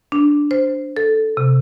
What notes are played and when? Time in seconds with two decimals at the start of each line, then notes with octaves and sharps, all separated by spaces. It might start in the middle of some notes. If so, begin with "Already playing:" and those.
0.12 D4
0.51 C5
0.97 A4
1.37 C3